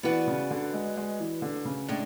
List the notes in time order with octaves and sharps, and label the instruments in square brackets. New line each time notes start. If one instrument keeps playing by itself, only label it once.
[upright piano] E3 [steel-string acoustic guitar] B3 F#4 B4 D5
[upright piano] C#3
D3
G#3
G#3
E3
D3
C#3
[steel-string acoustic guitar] A2 G#3 D4